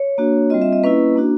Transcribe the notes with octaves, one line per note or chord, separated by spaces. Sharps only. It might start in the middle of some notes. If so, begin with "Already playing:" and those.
Already playing: C#5
A#3 D4 F#4
G3 C4 F4 D#5
E5
D#5
A#3 C#4 E4 B4
A#3 D4 F#4